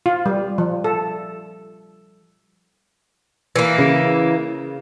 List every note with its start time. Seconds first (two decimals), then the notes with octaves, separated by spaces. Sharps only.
0.06 F4
0.26 G3
0.58 F3
0.84 A4
3.56 E3 A#3
3.78 C#3